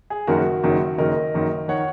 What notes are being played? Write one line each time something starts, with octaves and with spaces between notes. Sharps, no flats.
G#4
F#1 F#2 D#3 F#4 A#4
F#1 F#2 D#3
F#1 F#2 D#3 A#4 D#5
F#1 F#2 D#3
D#3 C#5 F#5